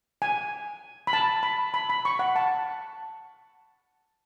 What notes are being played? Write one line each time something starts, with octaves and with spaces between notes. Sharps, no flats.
G#5
B5
A5
B5
B5
B5
C#6
F#5
A5